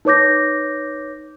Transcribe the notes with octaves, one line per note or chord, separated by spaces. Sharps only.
D#4 B4 C#5 D6 G6 A#6